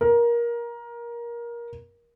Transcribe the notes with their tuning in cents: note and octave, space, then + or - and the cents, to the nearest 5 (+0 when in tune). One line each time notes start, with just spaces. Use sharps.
A#4 +20